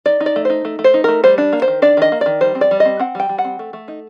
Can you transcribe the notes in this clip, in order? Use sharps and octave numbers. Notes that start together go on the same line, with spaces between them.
D#4 D5
D#4
D5
A3
D#4 C5
A3
A3
C5
D#4
A3 A#4
G3 C5
D4
A#3
C5
D#3
D4 D5
D#3 D#5
A#3
D#3 D5
G3 C5
C4
D5
G3
D#5
C4
C4 F#5
G3 G5
G3
F#5
C4
A3
A3
D#4